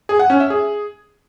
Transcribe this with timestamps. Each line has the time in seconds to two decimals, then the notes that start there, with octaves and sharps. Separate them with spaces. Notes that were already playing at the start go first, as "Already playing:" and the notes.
0.09 G#4
0.19 F#5
0.30 C#4
0.40 E5
0.50 G#4